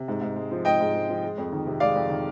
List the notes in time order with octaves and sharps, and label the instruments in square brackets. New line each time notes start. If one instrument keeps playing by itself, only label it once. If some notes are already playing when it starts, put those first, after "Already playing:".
Already playing: [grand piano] C3
G#2
G#2
G#3
F3
G#2 D#5 G5
G#2
G#3
F3
G#3
F2
D#3
C3
G#3 D5 F5
F2
D#3